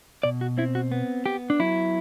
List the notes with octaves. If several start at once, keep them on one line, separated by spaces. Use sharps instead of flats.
B2 D5
F#4
C4 E4
F#4
B3
B3 G4
D4
F#3 E4